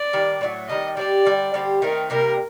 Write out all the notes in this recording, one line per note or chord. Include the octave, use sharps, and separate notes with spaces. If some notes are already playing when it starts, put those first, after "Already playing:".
Already playing: D5
D#3 G3 D4
A2 F#3 A3
D#3 G3 D4 D#5
G3 D4 G4 D5
D3 G3 D4
D3 G3 C4 G4
D#3 A3 C4 D#4 A#4
C3 G3 A#3 A#4